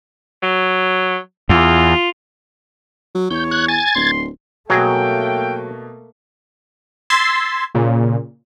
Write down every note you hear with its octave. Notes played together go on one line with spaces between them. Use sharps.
F#3
E2 F4
F#3
E2 C#5 G6
F#6 G#6
G#5 G#6 A6
D1 C6
B2 F#3 A3 A#3 G#4 E5 F5 G5
C6 E6 G#6 A6 B6 C7
A#2 C#3